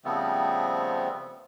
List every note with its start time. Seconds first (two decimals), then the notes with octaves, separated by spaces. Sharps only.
0.05 C#3 F3 G3 A3 B3 C4